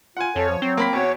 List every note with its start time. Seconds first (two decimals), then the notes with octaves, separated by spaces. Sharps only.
0.17 F4 F#5 G#5
0.36 F2 A4 C#5
0.49 F3
0.62 F#3 C4
0.77 A#3 B5 B6
0.93 E2 F#4 C#5